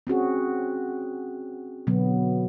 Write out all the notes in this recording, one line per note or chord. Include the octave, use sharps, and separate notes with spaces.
C4 C#4 F#4 G#4
B2 D3 F#3 B3